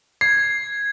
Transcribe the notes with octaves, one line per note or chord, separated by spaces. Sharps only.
G#6 C7